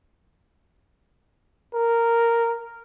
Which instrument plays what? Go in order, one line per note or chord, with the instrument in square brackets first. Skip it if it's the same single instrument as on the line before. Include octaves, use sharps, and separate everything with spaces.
[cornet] A#4